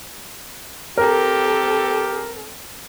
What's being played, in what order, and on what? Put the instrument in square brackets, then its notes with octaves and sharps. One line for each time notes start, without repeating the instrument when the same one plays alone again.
[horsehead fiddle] C4 A4 [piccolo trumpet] G4 [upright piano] A#4